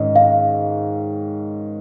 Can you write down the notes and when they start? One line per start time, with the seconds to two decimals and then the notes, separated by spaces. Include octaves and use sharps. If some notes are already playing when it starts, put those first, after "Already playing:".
Already playing: G#2 D#3 C#4 D#5
0.16 F5